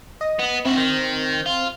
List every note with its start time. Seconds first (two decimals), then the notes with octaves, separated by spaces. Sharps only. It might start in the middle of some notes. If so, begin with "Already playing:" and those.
0.21 D#5
0.40 B3
0.66 C4 E4 F#4
0.77 D#3
1.46 F4